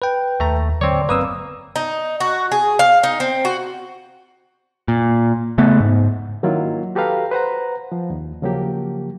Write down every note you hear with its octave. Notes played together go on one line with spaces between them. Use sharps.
B4 G5
D#2 A3 A#5
D3 F#3 C4 C#5 D5
G1 A#3 C4 B4 D#6 E6
D#4
F#4
G#4
F5
D#4
C4
F#4
A#2
C#3 A3 B3
G#2
D#3 F#3 A#3 C#4 E4 F4
F#4 G4 A4 B4 F5 A#5
B4 C5 F#5 A#5
F3
D#2
C#3 F3 F#3 A#3 G4